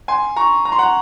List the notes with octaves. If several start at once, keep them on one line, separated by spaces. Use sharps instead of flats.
G#5 C6
A#5 C#6
A#5
C6
F#5 A#5